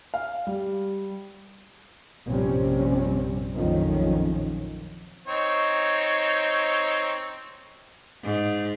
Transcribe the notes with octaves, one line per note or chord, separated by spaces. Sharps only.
F5
G3
A#1 F#2 C3 G3 C4 C#4
A#1 F2 D#3 F3 F#3 C#4
C4 D#4 C#5
G#2